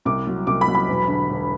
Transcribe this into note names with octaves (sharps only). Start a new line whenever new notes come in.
C2 D6
F#3
C2 D6
B5
F#3
B5
E1
D3
E1